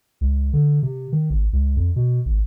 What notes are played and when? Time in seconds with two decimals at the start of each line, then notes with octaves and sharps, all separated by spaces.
0.21 C#2
0.53 D3
0.83 C3
1.12 D#3
1.30 G#1
1.53 C#2
1.77 F2
1.96 B2
2.26 G#1